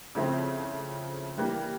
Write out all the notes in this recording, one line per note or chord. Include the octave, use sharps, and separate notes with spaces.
C#3 F3 A3 C4 E4
E3 G3 A#3